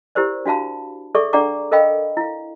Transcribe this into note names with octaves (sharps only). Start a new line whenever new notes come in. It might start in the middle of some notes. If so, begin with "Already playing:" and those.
E4 G4 A#4 C5 D5
D4 F#4 F5 A5 B5
G#4 A4 D5 E5 C#6
D4 D5 F#5 A#5 D6
A4 A#4 D#5 F5 G5 B5
E4 F5